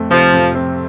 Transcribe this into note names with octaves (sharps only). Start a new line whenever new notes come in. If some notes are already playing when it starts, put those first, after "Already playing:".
Already playing: F2 A3 C4
C3 F3
F2
C4